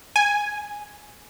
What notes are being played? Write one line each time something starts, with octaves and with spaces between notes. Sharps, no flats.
G#5